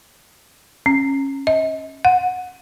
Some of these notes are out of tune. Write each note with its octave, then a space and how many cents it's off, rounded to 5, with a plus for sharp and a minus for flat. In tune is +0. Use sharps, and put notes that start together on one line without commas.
C#4 -20
D#5 +35
F#5 -20